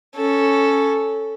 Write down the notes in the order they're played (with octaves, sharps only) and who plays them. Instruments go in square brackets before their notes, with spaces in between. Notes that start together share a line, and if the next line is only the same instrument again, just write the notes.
[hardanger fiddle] C#4 A4